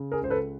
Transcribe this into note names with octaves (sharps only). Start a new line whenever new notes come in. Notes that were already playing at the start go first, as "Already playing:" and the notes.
Already playing: C#3
G#4 A#4
C#2 C5
A4 B4